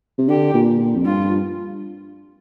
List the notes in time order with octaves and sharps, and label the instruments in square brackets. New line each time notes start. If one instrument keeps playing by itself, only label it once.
[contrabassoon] C3
[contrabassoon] D3 [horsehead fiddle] G4
[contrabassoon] A#2
A#2
F2
[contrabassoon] G2 [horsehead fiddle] F4